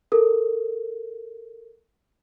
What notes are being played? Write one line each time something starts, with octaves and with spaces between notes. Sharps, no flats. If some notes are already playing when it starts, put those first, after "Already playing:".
A4 A#4